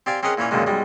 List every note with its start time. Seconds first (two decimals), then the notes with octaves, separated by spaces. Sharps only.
0.06 C4 G4 D5 F5 G#5
0.23 C4 C#4 G#4 A#4 D#5 F#5
0.38 A#2 E3 C#4 C#5
0.51 C#2 F#2 A#2 D3 D#3 G#3
0.67 B1 G3 G#3